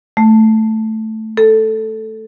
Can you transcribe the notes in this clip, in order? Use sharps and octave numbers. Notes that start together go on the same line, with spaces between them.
A3
A4